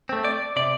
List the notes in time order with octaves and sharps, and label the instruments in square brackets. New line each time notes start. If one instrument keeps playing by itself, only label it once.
[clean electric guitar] A3 C4
D5
C3 D5